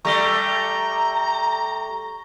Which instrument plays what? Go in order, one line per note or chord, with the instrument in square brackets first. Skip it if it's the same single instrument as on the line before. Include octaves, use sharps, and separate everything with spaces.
[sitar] G3 A3 [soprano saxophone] A#5 [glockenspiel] C#6 A#6 G7